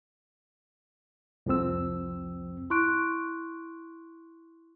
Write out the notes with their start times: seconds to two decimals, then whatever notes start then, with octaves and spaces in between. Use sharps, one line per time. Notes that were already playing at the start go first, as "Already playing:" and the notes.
1.46 C2 F2 F3 C4 E6
2.70 E4 C6 C#6 F#6 D7